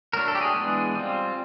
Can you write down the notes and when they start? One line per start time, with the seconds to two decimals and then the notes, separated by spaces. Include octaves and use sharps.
0.13 F#3 A3 D4 A#4
0.28 A4
0.35 G4
0.41 G#4
0.55 E3 G#3 B3 D4
0.95 G3 C4 F4